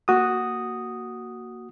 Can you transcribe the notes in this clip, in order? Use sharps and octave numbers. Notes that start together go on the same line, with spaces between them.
A#3 F#4 D#6